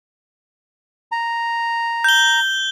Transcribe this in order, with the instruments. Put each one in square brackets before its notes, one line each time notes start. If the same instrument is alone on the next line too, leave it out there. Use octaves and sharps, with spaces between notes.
[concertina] A#5
[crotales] G6 G7